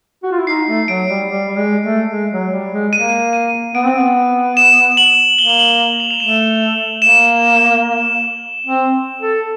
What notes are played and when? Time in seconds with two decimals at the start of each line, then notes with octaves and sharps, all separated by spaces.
0.23 F#4
0.32 F4
0.39 E4
0.47 D#4 C7
0.68 A3
0.88 F#3 D7
1.08 G3
1.29 G3
1.48 G3
1.57 G#3
1.83 A3
2.11 G#3
2.32 F#3
2.52 G3
2.72 G#3
2.93 A#3 D#7
3.33 D#7
3.75 B3 D7
3.85 C4
3.95 B3
4.57 E7
4.97 F#7
5.38 A#3 G7
5.49 F7
5.59 F#7
5.80 F#7
6.00 F7
6.11 F7
6.20 A3 E7
7.02 A#3 E7
8.67 C4
9.21 A4